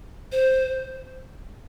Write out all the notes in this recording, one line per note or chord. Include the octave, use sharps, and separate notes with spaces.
C5